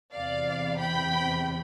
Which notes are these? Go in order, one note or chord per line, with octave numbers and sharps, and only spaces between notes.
E2 C3 E3 D5 F5
G5 B5